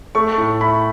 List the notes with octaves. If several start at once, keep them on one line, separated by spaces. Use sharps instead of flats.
A3 C#6
A2
E4 B5